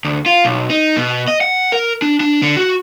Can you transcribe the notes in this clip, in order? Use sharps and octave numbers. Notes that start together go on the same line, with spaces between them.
D2
F4
B1
D#4
B2
D#5
F#5
A#4
D4
D4
D3
F#4